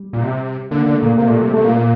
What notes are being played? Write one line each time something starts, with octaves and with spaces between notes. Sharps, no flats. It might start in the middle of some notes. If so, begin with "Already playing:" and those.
Already playing: G3
A#2
C3
D3 A#3
D3 A#3
A3
A#2 A#3
C3 A#3
A#2 A3
C3 G3
C3 A3
A#2 A#3
A#3